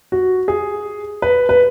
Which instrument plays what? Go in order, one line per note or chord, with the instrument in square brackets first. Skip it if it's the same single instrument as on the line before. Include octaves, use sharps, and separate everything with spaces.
[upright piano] F#4
G#4
B4
B4